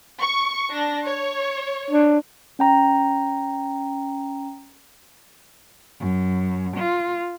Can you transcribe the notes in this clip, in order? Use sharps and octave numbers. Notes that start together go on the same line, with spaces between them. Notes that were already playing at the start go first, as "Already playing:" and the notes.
C#6
D4 A#6
C#5
D4
C#4 G5 A#5
F#2
F4